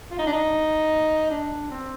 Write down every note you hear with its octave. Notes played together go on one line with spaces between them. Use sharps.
F4
D#4
D4
D#4
D4
C4